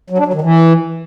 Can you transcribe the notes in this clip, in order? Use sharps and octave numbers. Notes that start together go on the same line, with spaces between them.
F#3
D4
F#3
D#3
E3